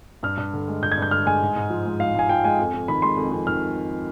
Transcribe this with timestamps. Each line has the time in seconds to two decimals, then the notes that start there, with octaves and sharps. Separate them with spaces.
0.23 G2 F6
0.37 G2
0.53 D3
0.68 G#3
0.82 G2 G6
0.92 G#6
0.97 G2
1.02 G6
1.11 D3 F6
1.26 G#3 G#5
1.41 G#2
1.56 G#2
1.70 F3
1.86 G#3
1.99 G#2 F5
2.15 G#2 G#5
2.29 F3 G5
2.44 G#3 G#5
2.59 F2
2.73 F2
2.88 D#3 B5
3.02 G#3 C6
3.17 F2
3.32 F2
3.47 D#3 F6